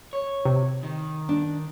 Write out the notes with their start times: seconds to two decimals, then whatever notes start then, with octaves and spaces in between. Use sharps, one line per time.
0.13 C#5
0.45 C3
0.83 D#3
1.29 D4